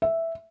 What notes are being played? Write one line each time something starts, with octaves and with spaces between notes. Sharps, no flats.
E5